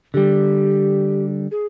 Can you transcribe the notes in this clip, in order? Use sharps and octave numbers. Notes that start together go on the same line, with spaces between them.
D3 G3 G4
G#4